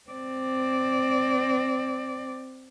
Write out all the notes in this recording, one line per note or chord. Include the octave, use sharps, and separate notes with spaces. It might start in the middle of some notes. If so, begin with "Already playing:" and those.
C4 D5